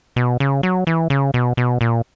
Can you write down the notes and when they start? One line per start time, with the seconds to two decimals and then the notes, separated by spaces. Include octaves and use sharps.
0.16 B2
0.40 C#3
0.63 F#3
0.87 E3
1.10 C#3
1.34 B2
1.57 B2
1.81 A#2